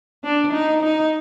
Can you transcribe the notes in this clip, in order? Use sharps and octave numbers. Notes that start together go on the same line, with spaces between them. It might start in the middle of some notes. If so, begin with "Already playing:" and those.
D4
D#4
D#4